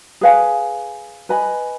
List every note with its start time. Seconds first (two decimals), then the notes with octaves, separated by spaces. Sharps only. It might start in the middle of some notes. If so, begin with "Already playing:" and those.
0.21 G#4 B4 F5 G#5
1.29 B4 D#5 G#5 B5